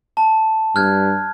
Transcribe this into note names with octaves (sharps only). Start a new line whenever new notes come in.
A5
G2 F6 F#6 G#6